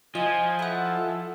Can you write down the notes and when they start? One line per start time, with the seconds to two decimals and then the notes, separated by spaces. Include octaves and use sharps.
0.15 F3 D#5 G#5
0.59 E4 A4 F#5